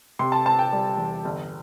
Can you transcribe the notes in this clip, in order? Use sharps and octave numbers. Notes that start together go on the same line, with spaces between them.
C3 C6
A5
C4 A5
G5
G3
E2
G1